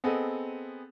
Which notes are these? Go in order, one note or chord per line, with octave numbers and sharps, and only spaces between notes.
B3 C4 G#4 A4 D#5